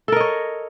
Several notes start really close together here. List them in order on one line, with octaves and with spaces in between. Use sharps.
A4 A#4 D#5 C#5